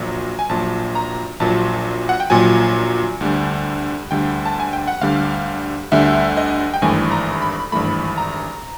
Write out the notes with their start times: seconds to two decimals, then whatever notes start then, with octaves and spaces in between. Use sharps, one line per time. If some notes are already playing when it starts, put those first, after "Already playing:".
Already playing: A#1 A#2 F#3
0.39 G#5
0.49 A#1 A#2 F#3 A5
0.95 A#5
1.40 A#1 A#2 F#3 A5
2.09 F#5
2.20 G5
2.30 A#1 A#2 F#3 G#5
3.21 D2 D3 G3
4.11 D2 D3 G3 G5
4.45 A5
4.60 G#5
4.73 G5
4.88 F#5
5.01 D2 D3 G3 F5
5.92 D2 D3 G3 E5
6.37 D#5
6.74 G5
6.82 G#1 G2 E3 A3 G#5
7.11 A#5
7.42 B5
7.72 G#1 G2 E3 A3 B5
8.18 A#5